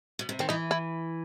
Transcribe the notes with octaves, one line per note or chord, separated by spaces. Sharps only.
B2
C3
D#3 C4
E3 D#4
E4